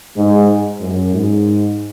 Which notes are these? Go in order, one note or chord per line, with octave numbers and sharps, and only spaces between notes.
G#2
F#2
G#2